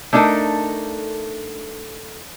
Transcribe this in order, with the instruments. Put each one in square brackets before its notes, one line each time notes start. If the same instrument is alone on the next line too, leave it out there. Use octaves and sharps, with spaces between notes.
[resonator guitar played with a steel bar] A3 D4 D#4 A4 A#4